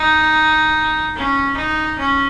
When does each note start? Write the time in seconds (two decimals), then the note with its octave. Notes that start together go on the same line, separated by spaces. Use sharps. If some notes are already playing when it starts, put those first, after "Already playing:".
Already playing: D#4
1.16 C#4
1.57 D#4
1.99 C#4